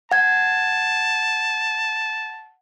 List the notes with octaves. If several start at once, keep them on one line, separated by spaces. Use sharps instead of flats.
F#5 A5 G#6